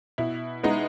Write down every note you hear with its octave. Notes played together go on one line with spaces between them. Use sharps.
B2 E4
G#3 B3 D#4